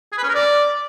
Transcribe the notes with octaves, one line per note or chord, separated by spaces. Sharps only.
G#4
B4
C#4
A#4
D5